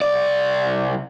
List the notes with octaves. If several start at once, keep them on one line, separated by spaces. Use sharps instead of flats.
C2 D5